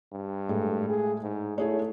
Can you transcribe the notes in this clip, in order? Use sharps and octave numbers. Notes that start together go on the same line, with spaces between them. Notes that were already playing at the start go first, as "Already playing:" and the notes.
G2
A2 G#3 A4
G#4
G#2
A3 E4 G#4 C#5